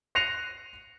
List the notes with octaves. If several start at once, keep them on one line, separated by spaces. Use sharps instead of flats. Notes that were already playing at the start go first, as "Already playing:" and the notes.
F#6 A#6 C7 C#7 D#7 F7